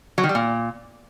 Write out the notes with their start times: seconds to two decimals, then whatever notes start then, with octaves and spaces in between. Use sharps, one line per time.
0.18 F#3
0.23 D#3
0.29 G3
0.35 A#2